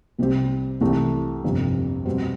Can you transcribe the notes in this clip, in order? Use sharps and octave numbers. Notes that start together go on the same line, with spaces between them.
C2 C3 G3 C4 G4
C2 C3 E3 A3
G1 F2 C3
B2 G3 C4